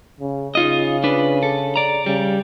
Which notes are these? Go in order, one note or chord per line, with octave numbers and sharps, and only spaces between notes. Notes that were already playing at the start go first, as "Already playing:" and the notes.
C#3
C#3 D#4 F4 D#5
D4 B4
A4
D5 A#5
C#3 G3